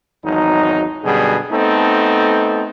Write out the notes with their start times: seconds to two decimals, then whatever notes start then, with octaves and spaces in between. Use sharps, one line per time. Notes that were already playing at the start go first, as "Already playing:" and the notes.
0.23 G#1 E2 F#3 D#4
1.04 F#2 B2 D3 G3 G#4
1.51 A3 B3 C4 D#4 A4